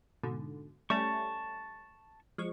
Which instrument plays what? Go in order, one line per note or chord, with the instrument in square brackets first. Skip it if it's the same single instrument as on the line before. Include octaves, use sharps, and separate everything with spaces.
[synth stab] G#2 B2 D3
[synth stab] G3 A3 C#4 [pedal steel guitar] A5 C#6
[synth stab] F3 G#3 C#6